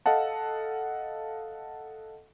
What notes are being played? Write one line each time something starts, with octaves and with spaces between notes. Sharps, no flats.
A4 D#5 F5 F#5 A5